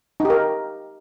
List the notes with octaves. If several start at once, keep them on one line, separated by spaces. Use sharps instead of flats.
D#4
G4
A#4